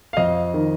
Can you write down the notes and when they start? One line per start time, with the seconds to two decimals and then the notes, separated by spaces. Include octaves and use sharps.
0.13 F5
0.17 F2 D#5
0.54 D#3